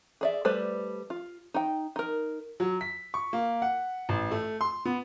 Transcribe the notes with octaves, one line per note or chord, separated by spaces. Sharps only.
G#4 D5 E5
G3 A3 B4 C5 D5
F4
D#4 G5
D#4 A#4
F#3
B6
C#6
A#3
F#5
A1
A3
C6
B3